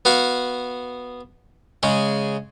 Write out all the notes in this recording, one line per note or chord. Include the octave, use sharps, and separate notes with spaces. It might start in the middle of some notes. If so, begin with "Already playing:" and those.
B3 F#4 F5
C#3 G#3 C#4